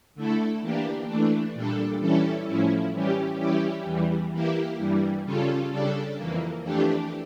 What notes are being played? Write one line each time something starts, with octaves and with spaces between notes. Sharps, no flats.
D3 A3 E4 A4
E3 A#3 D4 G4
E3 A3 D4
A#2 G3 D4 A4
E3 G3 C#4 E4 A4
A2 F3 C#4 E4
E3 G3 C#4 G4
E3 G3 C#4 E4 G4
E2 E3 G3
E3 A#3 E4 G4
G2 E3 G3
C#3 G3 C#4 F4 A4
C#3 G3 D4 A4
F2 E3 A#3
F2 E3 A3 D4 G4